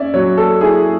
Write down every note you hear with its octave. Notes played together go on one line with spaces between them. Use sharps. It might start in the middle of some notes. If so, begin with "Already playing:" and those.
Already playing: C#4 D5 E5
F#3 C#5
A4
E4 G#4